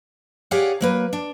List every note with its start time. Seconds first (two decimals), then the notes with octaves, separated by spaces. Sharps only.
0.51 G4 G#4 C#5 D5 F5 F#5
0.81 F#3 A#3 B4
1.13 D4